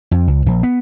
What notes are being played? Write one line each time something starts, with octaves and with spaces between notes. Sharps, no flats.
F2
C#2
A#1
B3